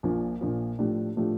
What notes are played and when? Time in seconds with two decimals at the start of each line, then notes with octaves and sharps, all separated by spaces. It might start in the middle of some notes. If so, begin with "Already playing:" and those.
0.03 A#1 A#2 F3
0.41 A#1 A#2 F3
0.79 A2 F3 A3 D4 G4
1.16 A2 F3 A3 D4 G4